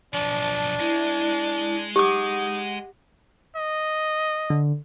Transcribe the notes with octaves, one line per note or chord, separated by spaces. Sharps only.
B1 F3 D4 A5
G#3 E4
D#4 G4 F#5 D6
D#5
D3